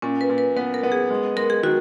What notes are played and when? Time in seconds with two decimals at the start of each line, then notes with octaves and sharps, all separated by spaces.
0.02 A#2 C#4
0.21 B4
0.29 A#2
0.38 B4
0.56 B3 B4
0.74 A#4
0.83 B3
0.92 G#4
1.10 G#3
1.37 G#3 A#4
1.50 G#4
1.63 D#3 F#4